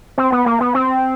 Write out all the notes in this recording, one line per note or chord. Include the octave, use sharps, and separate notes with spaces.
C4
B3
A#3
B3
C4